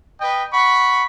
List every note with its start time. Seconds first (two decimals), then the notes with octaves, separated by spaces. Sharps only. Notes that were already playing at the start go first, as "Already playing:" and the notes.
0.21 B4 D#5 G5
0.53 F#5 B5 C#6